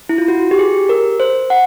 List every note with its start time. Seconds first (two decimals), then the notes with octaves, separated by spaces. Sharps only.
0.09 E4
0.18 F4
0.28 F#4
0.51 G4
0.59 G#4
0.89 A#4
1.20 C5
1.50 F#5